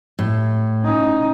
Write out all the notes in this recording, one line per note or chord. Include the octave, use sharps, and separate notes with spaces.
A2
C#4 D#4